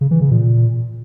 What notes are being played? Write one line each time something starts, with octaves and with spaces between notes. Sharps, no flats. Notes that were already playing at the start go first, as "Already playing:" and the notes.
C#3
E3
C#3
A#2